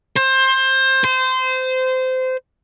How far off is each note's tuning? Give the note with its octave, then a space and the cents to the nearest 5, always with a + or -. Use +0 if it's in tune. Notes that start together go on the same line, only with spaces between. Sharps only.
C5 +20
C5 -20